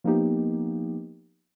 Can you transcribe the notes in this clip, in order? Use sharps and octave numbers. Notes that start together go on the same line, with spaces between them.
F3 A#3 B3 D#4 G4